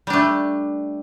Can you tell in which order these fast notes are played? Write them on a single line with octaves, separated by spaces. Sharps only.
G3 D4 A3